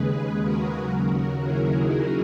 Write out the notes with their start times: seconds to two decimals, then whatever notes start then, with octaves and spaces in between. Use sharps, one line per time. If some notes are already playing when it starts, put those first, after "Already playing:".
Already playing: D#2 C#3 G#3 G#4 B4
0.43 F#4 A#4
0.77 D#2 C#3 F#3
1.44 E4 G#4
1.78 D#4 F#4